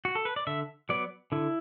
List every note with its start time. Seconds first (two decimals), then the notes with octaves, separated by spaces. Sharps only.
0.05 F#4
0.15 A4
0.25 B4
0.36 D5
0.47 D3 E5
0.89 F#3 B3 D5
1.32 D3 E4